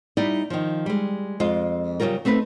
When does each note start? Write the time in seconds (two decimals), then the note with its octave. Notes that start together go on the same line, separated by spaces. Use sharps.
0.17 G3 D#4 E4 D5
0.50 D#3 F3
0.86 G3 G#3
1.40 F2 G#3 F4
2.00 C#3 F#3 G3 F4 A#4
2.25 A3 C4 D#4 B4